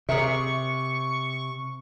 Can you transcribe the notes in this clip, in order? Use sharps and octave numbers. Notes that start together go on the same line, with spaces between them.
C3 G#4 A#4 E5 C#6